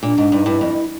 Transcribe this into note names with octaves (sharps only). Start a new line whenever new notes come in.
A#2 D4
G#2
G2 D#4
G2 E4
F2